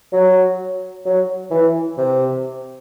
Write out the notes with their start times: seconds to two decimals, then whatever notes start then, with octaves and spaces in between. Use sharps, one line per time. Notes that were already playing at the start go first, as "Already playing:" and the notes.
0.13 F#3
1.06 F#3
1.51 E3
1.98 C3